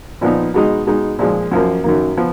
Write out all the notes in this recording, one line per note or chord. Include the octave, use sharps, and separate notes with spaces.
A#2 F3 B3 D#4
B2 G#3 D#4
B2 G#3 D#4
A#2 F3 G#3
F#2 F3 A#3
F#2 D#3 A#3
F3 B3